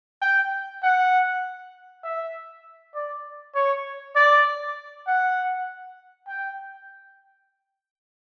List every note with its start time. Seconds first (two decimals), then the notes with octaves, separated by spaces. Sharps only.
0.22 G5
0.83 F#5
2.04 E5
2.95 D5
3.55 C#5
4.16 D5
5.07 F#5
6.28 G5